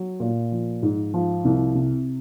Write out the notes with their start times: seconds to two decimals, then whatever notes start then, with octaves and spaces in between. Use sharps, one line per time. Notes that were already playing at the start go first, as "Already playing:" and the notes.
Already playing: F#3
0.20 A#2
0.52 F3
0.83 G#2
1.14 F3
1.45 C2
1.75 C3